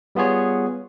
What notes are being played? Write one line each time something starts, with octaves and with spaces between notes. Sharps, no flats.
G3 B3 F4 G#4 C#5